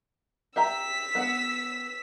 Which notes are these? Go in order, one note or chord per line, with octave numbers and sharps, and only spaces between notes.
G4 E5 A#5 E6 B6
B3 F#5